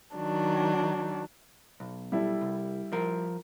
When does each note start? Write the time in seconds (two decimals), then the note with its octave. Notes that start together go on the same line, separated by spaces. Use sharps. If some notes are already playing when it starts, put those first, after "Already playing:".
0.15 D#3 F#3 D4
1.80 B1
2.12 G3 E4 A4
2.41 C2
2.93 F3 A#4